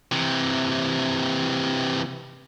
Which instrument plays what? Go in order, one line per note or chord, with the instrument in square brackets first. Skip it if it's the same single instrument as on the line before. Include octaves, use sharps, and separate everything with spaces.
[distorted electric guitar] C3 E3